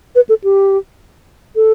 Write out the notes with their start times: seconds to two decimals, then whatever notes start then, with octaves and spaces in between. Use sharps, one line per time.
0.15 B4
0.29 A4
0.44 G4
1.56 A4